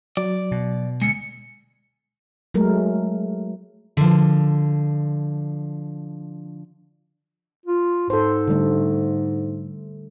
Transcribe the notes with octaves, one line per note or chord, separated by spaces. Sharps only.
F#3 D5
B2
D2 G#3 C#7
F#3 G#3 A3 A#4
D3 F3
F4
G#2 A4 C5
D3 G3 A3